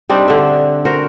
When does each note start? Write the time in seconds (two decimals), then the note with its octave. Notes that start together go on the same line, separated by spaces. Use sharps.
0.10 G3 C4 D4 D#4
0.28 D3 E5
0.85 F#4 A#4 C5